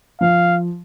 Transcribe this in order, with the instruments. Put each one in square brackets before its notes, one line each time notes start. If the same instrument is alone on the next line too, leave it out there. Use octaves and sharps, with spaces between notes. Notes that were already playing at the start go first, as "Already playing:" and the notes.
[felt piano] F3 [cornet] F5